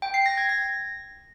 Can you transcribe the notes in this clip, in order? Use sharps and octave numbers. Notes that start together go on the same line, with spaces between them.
G5
C7
A#6
G#6
A#6